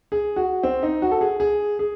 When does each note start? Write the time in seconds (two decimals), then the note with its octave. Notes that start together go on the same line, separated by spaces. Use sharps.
0.12 G#4
0.36 F#4
0.63 C4
0.83 D#4
1.02 F#4
1.11 A4
1.21 G#4
1.40 G#4
1.79 G#4